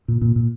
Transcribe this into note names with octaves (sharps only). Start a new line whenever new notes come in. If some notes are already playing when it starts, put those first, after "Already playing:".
A#2
A#2
A#2